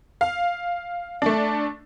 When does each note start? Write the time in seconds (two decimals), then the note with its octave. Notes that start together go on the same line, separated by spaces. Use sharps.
0.21 F5
1.22 A3 D4